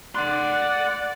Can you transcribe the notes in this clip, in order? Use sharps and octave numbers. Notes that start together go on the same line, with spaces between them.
D5 F#5 C6 F#6